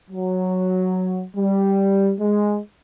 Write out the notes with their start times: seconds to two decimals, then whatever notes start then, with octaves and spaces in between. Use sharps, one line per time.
0.11 F#3
1.36 G3
2.20 G#3